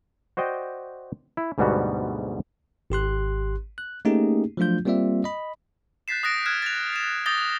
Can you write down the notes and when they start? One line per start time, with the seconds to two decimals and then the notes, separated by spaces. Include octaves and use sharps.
0.37 F#4 C5 D5 D#5 G5
1.37 E4
1.58 D2 G#2 B2 G3 B3 F#4
2.90 G#1 G4 C6 F#6
3.78 F#6
4.05 A3 A#3 C#4 D#4 G4 G#4
4.57 F3 F#3 A3 D4 F4 G6
4.85 G3 A#3 C4 F4 D5 E5
5.24 D#5 B5
6.08 F#6 G6 A6 B6 C7 E7
6.23 D#6 F#6 A6 A#6 C7 D7
6.46 F6 F#6 G#6 A#6 E7
6.62 A6 F7
6.93 C7 E7
7.26 D6 D#6 G6 A6 A#6 G7